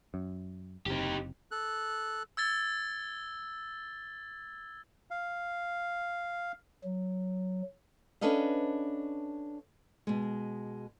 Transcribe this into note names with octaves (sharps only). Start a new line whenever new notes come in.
F#2
F#1 C3 D#4 G4
A4 F#6
E6 G#6 A6 G7
F5
F#3
C#4 D4 A4 B4 D#5 F5
B2 G#3